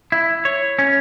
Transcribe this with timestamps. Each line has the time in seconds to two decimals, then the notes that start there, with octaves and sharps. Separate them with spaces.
0.12 E4
0.45 C#5
0.79 C#4